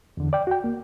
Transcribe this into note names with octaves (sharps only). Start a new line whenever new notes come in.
E2 D3
D5 G5
F#4 G5
A#3